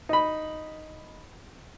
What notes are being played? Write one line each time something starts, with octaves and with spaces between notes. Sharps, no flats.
D#4 B5